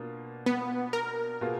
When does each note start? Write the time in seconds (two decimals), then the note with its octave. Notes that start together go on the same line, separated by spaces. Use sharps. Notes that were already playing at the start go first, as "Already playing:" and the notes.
Already playing: B2 A#3 D4 F4
0.46 B3
0.93 A#4
1.41 B2 A#3 F4 G#4